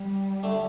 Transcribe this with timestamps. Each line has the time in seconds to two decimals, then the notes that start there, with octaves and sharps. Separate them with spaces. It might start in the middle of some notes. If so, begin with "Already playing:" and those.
Already playing: G3
0.43 D3 A3 D4